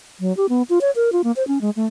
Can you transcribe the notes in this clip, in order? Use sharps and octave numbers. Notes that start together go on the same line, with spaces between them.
F#3
G4
B3
F4
C#5
A#4
F4
A#3
C5
C#4
G#3
A3